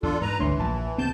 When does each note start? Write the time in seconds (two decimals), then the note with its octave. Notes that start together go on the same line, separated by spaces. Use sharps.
0.03 E2 D4 F4 A4
0.21 G#2 B4 A#5
0.39 G1 D2 E3 A3 D4 C#5 C6
0.60 A#1 A#2 A5
0.98 C#2 C#3 B3 C4 A5 G6